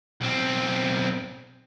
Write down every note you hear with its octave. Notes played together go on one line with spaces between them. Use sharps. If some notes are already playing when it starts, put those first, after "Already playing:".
B1 C4